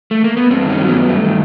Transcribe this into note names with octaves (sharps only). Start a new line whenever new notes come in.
A3
A#3
B3
G2 C4
D#3
C#4
F#3
G2 B3
G2 A3
D#3